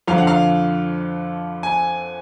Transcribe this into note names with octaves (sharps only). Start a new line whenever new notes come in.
F2 D3 F3 F5
F#5
F5
G#5